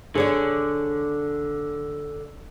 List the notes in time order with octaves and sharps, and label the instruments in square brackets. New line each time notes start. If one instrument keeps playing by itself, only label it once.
[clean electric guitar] D3 [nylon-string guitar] G#4 C#5 D5